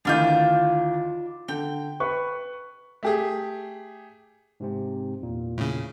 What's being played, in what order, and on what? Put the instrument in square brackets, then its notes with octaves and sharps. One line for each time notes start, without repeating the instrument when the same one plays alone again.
[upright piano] D2 D#3 E3 [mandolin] D4 F4 G6
[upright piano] D3 [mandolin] G5
[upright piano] B4 C#6
A3 G4 G#4
[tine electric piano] G#2 C3 C4
E2 A#2
[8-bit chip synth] A2 C#3